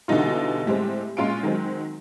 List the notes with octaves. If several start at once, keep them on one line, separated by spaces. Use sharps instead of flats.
B2 D3 E3 G3 D#4 F4
A2 G3 G#3 C4
A#2 G#3 C#4 F4 C6 D7
D#3 F#3 G#3 C4